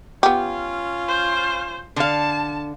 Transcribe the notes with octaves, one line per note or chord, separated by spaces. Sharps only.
B3 C#4 F4 G4
C5
D3 F5 A5